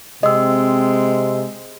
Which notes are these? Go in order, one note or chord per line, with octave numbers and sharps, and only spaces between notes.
C3 G#3 C4 D#5 E6